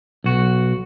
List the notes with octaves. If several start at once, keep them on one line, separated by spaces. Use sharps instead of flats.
B1 F#4